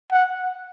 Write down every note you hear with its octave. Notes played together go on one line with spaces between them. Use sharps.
F#5